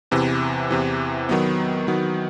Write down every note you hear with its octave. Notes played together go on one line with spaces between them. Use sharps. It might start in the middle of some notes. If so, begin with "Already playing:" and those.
E2 C3 E3
E2 C3 E3
D#3 F#3 B3
D#3 F#3 B3